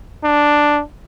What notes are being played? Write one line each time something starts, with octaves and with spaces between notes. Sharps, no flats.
D4